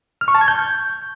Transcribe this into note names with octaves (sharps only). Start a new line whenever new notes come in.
F6
C#6
A5
G#6
G6